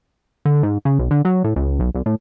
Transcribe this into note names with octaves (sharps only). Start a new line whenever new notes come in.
D3
G#2
C#3
B1
D3
F#3
A2
C#2
B1
C2
A2